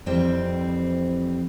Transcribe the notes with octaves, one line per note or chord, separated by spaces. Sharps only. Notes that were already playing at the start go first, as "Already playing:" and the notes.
F2 E3 G3 C4